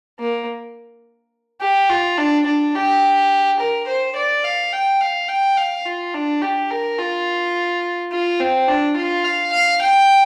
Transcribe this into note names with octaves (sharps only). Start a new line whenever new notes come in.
A#3
G4
F4
D4
D4
G4
A#4
C5
D5
F5
G5
F5
G5
F5
F4
D4
G4
A#4
F4
F4
C4
D4
F4
F5
F5
G5